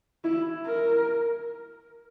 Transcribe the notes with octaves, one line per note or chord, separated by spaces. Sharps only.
E4
A#4